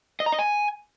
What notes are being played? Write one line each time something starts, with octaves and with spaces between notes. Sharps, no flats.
D#5
A#5
D#5
G#5